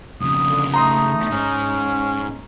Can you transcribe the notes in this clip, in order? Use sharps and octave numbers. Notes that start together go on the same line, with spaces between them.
F2 C#3 D#6
D3
A3 D#4 A#5 C6 D#6
G#2 C#4